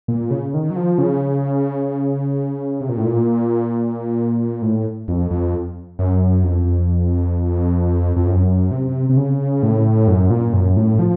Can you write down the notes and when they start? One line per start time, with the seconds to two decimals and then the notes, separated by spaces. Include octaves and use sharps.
0.08 A#2
0.31 C#3
0.54 D#3
0.70 F#3
0.76 F3
0.98 C#3
2.81 C3
2.89 A#2
2.97 A2
3.06 A#2
4.62 A2
5.08 F2
5.31 F2
5.99 F#2
6.44 F2
8.17 F2
8.26 F#2
8.71 C3
9.09 C3
9.17 C#3
9.63 A2
10.07 F#2
10.30 A#2
10.53 F#2
10.76 A2
10.99 F3